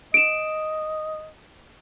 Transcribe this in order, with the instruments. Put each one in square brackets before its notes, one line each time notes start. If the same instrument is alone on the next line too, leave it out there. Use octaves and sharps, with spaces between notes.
[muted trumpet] D#5 [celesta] D7 E7